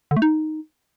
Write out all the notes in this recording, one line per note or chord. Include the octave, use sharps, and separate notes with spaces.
D3
A3
D#4